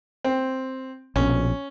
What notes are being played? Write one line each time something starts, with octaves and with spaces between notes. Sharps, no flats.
C4
A#1 B2 C#4